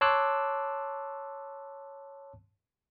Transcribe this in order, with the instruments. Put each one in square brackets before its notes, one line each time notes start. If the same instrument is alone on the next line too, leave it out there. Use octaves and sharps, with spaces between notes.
[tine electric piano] C#5 A5 C6 D6 E6 F#6